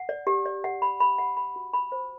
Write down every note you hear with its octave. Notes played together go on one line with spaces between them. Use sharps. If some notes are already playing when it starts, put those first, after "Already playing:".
Already playing: F#5
D5
G4
D5
F#5
B5
B5
F#5
B5
F#4
B5
C5